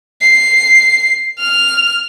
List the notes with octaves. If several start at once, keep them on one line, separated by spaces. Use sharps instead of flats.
C7
F6